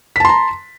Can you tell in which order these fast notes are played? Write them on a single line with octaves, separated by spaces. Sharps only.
B6 A5 C6 A#5